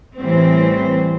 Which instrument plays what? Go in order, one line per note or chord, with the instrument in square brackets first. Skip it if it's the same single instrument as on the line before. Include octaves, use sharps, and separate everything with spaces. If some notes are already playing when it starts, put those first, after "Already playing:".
[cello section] A2 E3 G3 C4